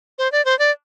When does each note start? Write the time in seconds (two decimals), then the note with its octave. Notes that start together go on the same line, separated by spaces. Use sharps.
0.19 C5
0.32 D5
0.45 C5
0.59 D5